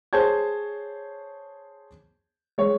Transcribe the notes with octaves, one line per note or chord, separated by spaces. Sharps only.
G#4 C5 C#5 A5 G6 G#6
G#3 C#5